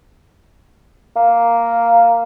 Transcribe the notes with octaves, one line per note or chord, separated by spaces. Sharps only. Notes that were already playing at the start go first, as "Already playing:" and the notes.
A#3